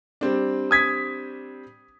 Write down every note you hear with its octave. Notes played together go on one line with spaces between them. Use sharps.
G3 C4 D4
D#6 G#6 B6